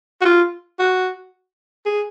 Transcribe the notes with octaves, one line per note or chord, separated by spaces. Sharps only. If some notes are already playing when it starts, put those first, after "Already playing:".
F#4
F4
F#4
G#4